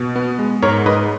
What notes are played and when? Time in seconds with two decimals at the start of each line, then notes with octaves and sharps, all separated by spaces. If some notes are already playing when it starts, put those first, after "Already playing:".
Already playing: B2
0.16 B3
0.39 G#3
0.62 G#2 A#4 C#5
0.86 G#2 B4 D#5